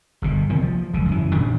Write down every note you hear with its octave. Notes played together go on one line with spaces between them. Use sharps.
G1 B2
C2 D#3 A#3 C4
F3
F#1 C#2 C#3
F#2 E3
A#2 D#3 D4